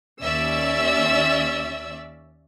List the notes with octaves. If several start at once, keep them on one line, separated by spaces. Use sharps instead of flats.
D#2 C#4 D5 E5 E6